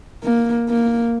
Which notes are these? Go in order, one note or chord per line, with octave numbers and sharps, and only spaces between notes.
A#3
A#3